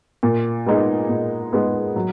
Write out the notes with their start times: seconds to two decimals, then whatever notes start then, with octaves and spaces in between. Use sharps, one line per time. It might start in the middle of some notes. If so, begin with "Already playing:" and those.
0.23 A#2
0.66 G#3 B3 D#4 G#4
1.09 A#2
1.52 G#3 B3 D#4 G#4
1.96 F#3